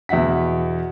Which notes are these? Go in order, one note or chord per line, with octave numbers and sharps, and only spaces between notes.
E2 B2 E5 F#5 B6